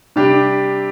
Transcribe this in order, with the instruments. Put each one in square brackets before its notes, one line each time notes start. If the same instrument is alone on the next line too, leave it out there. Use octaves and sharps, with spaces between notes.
[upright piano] C3 G3 D4 G4